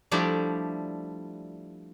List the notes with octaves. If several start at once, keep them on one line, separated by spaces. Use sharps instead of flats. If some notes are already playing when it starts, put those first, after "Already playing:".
F3 G3 A3 D4 E4 G4